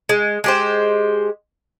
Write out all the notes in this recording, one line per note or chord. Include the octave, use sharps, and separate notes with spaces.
G#3
G#3 G4 C5